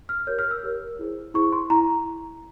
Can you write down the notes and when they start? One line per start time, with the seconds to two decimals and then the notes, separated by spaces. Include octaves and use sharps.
0.09 F6
0.27 G4 A#4 C#5 G6
0.39 F6
0.51 E6
0.63 G4 A#4 C#5
0.99 E4 G#4 C5
1.34 E4 G#4 C5 C#6
1.52 C6
1.70 E4 A#5